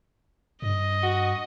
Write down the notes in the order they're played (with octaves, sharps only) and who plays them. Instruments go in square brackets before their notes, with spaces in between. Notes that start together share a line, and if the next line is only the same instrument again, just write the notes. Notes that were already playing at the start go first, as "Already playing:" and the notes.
[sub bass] G2 [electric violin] D#5
[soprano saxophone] F#4